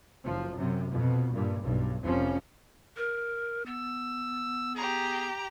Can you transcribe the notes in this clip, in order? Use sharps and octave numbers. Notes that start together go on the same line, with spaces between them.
F#1 F3
F#2 C3
F2 B2
G2 A#2
B1 G2
F1 F2 F3 C#4
A#4
B3 E6
G4 G#4 A#5